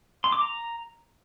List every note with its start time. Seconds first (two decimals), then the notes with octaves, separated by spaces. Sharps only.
0.24 C6
0.32 D6
0.41 A#5